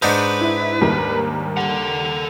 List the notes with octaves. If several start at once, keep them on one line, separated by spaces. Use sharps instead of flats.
G#2 D4 D#4 B4 G6 C#7 E7
E4
D#2 G3 A#4
A4 F#5